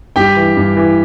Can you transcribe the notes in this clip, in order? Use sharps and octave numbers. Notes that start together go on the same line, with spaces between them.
G2 G4 G5
E3
G2
E3